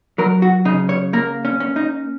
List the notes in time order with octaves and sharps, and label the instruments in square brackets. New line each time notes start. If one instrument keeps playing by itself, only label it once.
[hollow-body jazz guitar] F#3 A#4
F#4
C#3 D#4
C#5
A#3 A#4
C#4
C#4
D#4